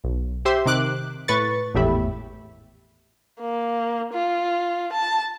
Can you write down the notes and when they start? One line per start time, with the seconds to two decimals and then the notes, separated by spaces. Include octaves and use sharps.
0.04 B1
0.45 G4 C5 E5 C6
0.66 C3 D#3 D6 F#6
1.28 A2 B4 C#6 A6
1.74 G#1 E2 A2 G4 E5 B5
3.40 A#3
4.13 F4
4.92 A5